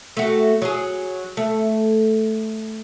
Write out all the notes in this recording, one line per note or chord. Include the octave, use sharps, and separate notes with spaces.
A3 F#4
F#3 G#4
A3